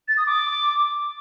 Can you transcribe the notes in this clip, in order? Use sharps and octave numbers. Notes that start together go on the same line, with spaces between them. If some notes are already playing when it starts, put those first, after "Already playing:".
A6
D#6
D6